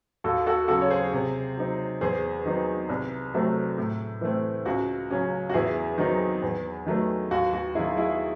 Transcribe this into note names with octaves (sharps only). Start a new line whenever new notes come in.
D#2 F#4 A4
F#4 A4
C#3 F#3 F#4 A4
C#5
G#4 C5
C3
F#3 C4 D#4
E2 G#4 C5
D#3 F#3 C4 D#4
C2
C3 F#3 A3 C4
A2
E3 A3 C4
C#2 F#4
C#3 F#3 C#4
F#4
E2 E4 G#4
D#3 F#3 C4 D#4
E2
D#3 F#3 A3
D#2 F#4
F#4
D#3 F#3 E4 G#4
E4 G#4